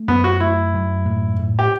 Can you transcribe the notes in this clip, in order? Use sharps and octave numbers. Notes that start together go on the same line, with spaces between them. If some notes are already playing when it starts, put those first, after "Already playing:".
Already playing: A3
F#2 B3
F#4
A3 E4
F#2
A2
A2
G4